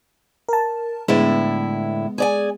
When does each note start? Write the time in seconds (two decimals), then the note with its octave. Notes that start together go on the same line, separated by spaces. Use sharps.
0.49 A#4 A5
1.08 A2 D3 G#3 B3 E4
2.18 G#4 D5 G#5